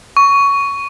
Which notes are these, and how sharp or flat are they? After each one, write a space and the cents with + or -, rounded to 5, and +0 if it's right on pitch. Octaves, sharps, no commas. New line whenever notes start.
C#6 +15